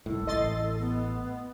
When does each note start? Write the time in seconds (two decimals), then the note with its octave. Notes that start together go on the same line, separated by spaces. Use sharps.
0.06 F#1 C2 A2 A4
0.27 A1 A2 D#5 C6 A6
0.79 B3